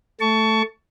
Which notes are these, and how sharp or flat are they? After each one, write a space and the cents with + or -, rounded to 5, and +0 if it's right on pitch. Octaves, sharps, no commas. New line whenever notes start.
A3 +0 A5 +0 C#6 +20